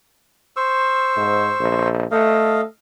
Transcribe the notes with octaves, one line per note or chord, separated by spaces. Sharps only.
C5 C#6 E6
G#2
A#1
A3 A4 D#5 F5